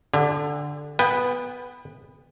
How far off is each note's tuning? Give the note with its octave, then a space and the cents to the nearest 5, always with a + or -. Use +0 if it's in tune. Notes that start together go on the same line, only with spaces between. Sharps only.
D3 +0 G4 +40
B3 +0 B4 +0 G5 +30